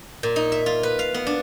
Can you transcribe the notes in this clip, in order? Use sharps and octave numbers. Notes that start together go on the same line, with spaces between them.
A#2
D#4
E5
F4
B4
F5
B3
D4